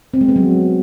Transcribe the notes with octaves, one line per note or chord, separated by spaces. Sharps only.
C4
G#3
B3
F#3